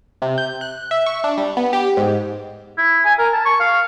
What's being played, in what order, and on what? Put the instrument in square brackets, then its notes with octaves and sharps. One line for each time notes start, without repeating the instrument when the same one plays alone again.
[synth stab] C3
G6
F#6
E5
C#6
D4
G3
B3
G4
G#2
[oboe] E4
G#5
A#4
A5
C#6
F5